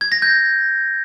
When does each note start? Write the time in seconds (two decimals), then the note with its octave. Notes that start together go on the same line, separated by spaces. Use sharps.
0.01 G#6
0.12 A#6
0.22 G6